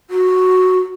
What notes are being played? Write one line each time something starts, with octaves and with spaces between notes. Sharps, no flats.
F#4